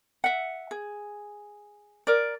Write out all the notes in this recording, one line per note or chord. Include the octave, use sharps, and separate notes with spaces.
E5 F#5
G#4
A#4 D5